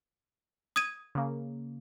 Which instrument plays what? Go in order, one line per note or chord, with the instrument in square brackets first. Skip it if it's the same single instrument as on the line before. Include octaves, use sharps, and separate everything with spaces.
[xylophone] D#6 G#6 D#7
[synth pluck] C#3 A#3